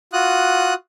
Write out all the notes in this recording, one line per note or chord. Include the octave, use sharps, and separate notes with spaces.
F4 F#4 D#6 F#6